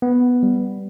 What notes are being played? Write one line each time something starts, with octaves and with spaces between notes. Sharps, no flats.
B3
G3